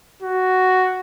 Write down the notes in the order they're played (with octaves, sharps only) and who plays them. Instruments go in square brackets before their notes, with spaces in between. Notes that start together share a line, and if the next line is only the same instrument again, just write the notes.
[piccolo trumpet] F#4